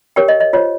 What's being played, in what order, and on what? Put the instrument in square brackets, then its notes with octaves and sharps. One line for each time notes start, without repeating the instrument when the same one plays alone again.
[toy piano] G4 A#4 C#5 G5
D#5
D#5
F4 C5 C#5